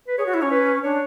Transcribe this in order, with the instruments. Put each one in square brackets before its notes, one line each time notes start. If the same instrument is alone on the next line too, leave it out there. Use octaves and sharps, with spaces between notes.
[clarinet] B4
[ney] G#4 [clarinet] C#5
[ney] F#4
E4
[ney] C#4 [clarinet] C#5
[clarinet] B4
[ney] D4 [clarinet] C#5